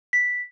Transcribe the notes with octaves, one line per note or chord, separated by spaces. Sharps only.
B6